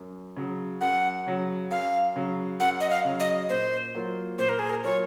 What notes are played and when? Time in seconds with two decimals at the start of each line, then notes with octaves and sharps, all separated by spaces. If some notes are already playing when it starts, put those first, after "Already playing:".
Already playing: F#2
0.36 C#3 F#3
0.81 F#2 F#5
1.26 C#3 F#3
1.71 F#2 F5
2.16 C#3 F#3
2.60 F#2 F#5
2.80 D#5
2.90 F5
3.04 C#3 F#3
3.20 D#5
3.49 A#2 C5
3.95 F#3 A#3 F4
4.38 A#2 C5
4.49 A#4
4.59 G#4
4.70 A#4
4.84 F#3 A#3 F4 C#5